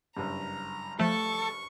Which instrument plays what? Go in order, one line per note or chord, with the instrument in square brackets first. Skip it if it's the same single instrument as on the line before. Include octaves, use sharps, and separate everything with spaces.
[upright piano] F#1 G2 [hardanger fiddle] A#5
[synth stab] F3 A3 [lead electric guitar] A4 [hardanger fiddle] C#6